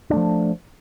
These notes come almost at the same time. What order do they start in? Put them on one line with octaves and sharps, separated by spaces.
D4 A3 F3